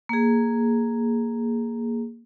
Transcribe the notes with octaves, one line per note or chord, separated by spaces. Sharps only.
A#3 G#4